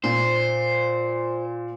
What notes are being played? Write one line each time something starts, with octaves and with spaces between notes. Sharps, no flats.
A#2 C5